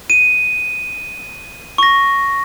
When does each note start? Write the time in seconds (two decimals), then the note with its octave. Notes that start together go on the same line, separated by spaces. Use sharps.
0.10 D#7
1.78 C#6 A#6